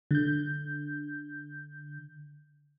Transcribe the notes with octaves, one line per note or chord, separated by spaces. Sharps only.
D3 G6